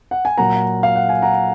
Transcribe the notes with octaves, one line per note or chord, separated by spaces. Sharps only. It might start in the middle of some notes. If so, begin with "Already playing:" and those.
F#5
G#5
A#2 F#3 A#3 F#5 A#5
F5
F#5
G#5
F#5 A#5